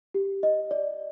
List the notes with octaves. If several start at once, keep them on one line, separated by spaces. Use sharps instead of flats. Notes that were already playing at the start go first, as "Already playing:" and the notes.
G4
D#5
D5